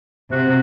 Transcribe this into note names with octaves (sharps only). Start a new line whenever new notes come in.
C3 F#4